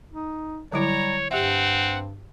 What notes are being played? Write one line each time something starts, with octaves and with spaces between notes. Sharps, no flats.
D#4
D3 F#3 G3 E4 C#5 A#5
G2 C4 G4 E5 F#5